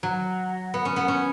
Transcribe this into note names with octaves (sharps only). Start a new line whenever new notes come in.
F#3
B3
C#4
B3
C#4